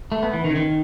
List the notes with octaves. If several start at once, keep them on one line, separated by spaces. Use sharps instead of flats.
A3
B3
E3
D#3
C#3
D#3